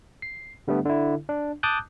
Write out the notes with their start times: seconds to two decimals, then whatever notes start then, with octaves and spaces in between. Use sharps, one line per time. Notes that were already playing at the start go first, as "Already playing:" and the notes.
0.22 C7
0.68 D3 G3 A3 B3 D4
0.86 D3 E4
1.29 D4
1.63 A5 D6 D#6 F#6 G6